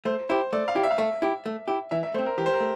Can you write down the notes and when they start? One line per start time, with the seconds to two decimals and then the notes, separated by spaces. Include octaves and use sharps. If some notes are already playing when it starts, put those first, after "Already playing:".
0.05 A3 C5
0.29 E4 G4 C5
0.53 A3 D5
0.68 F5
0.75 E4 G4
0.83 E5
0.91 F5
0.98 A3 E5
1.22 E4 G4
1.46 A3
1.68 E4 G4
1.91 E3 E5
2.03 E5
2.14 A3 C5
2.18 C4
2.26 A#4
2.38 E3 G4
2.46 C5
2.53 A#4
2.60 A3